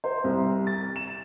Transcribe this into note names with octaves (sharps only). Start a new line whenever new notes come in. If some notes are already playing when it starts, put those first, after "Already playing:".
C5
C2
A6
E7